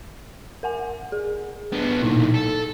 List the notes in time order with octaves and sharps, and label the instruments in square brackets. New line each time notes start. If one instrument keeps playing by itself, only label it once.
[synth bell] A#4 F#5 G#5
G#4
[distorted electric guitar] D3 B3
[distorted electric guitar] B1 A#2 [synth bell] A#3 D#4 E4
[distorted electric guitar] A4